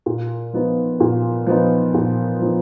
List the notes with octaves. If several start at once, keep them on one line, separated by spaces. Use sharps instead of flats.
A#2
F3 B3 D#4
A#2
F3 B3 D#4
A#2
F3 B3 D#4